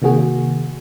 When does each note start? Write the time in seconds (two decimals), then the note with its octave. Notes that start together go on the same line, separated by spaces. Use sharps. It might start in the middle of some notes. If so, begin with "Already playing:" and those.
0.02 C3 D#3 A#3 F#4 G#4